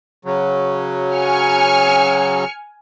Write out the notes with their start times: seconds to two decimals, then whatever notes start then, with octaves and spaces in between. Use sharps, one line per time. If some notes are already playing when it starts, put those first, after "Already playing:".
0.25 C#3 F#3
1.14 G#5 F6 C#7